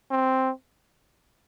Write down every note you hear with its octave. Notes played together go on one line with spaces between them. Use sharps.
C4